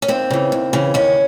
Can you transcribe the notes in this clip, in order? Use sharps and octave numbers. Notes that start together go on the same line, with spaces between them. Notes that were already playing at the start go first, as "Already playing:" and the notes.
C#4
D#2 C4
C#3 E3
D#2
C#3 E3
D#2 C#4